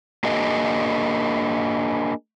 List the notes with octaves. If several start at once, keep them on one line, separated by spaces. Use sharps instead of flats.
A#3 D4 F#4 G#4 A#4 D#5